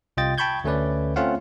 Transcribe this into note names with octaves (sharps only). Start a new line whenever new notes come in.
C2 C3 F4 D#5 G5 A6
G5 A5 B5 C#6 G6 G#6
D2 A3 C#4 B4 D5
A3 C4 C#4 F4 F5 F#5